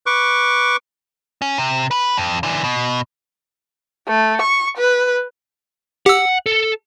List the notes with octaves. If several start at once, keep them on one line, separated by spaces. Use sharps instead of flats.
B4 C#6 D6
C#4
C3
B4 B5
F2
D3 E3
B2
A3
C#6
B4
G4 F#5 E6
A4